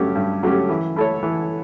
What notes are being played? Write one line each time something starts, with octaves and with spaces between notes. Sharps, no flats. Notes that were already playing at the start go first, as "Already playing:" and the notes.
Already playing: G2 F#3 A3 C#4 G4
G2
F#3 A3 C#4 G4
E3
A3 E4 A4 C#5
E3